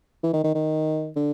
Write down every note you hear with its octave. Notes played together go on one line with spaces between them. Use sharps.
E3
D#3
D#3
D#3
D3